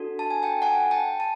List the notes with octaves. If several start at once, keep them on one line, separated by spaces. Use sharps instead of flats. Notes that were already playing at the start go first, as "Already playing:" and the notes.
Already playing: D4 F#4 A4
A5
G#5
G5 A5
F#5 G#5
G5 A5
A5